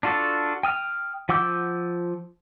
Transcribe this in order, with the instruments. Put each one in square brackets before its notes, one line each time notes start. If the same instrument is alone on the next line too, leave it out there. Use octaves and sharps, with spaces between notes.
[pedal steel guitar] D4 F4 F#4 A4
G5 D#6 F6
F3 F#5 D6 E6 G6